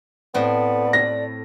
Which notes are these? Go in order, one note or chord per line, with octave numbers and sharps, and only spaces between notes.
A2 B3 C4 D5
A#6